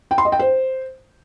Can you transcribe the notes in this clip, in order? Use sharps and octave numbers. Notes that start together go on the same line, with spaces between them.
G5
C6
D#5
G5
C5